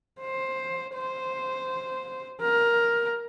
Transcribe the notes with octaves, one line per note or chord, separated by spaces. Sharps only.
C5
C5
A#4